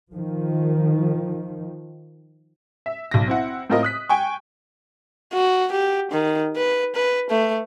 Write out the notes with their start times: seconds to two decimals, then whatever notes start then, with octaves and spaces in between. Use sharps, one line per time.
0.12 D#3 F3
2.86 E5
3.11 B1 A#6
3.28 C4 E4 F#5
3.70 A2 C4 F4 A#4 D#5
3.83 D#6 F#6 B6
4.09 G5 G#5 C#6
5.33 F#4
5.71 G4
6.11 D#3
6.57 B4
6.95 B4
7.30 A3